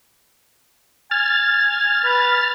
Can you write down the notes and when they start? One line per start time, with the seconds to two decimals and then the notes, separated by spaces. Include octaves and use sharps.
1.11 G#5 F6 A6
2.05 B4